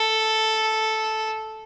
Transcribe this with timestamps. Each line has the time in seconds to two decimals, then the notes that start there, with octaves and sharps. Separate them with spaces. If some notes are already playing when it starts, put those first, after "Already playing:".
Already playing: A4